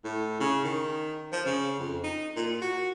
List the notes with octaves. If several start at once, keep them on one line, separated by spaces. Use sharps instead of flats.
A2
C#3
D#3
F3
C#3
F2
D#4
A#2
F#4